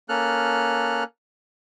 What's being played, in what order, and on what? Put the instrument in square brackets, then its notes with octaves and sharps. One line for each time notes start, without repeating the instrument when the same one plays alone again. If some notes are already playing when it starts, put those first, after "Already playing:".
[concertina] A#3 C#4 A4 F6 F#6